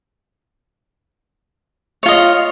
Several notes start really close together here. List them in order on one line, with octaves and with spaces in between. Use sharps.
C#5 F4 D#5